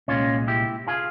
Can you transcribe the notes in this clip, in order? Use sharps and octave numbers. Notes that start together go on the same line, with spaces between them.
C2 A#2 G#3 C#4 F4
E4 G4
F4 G#4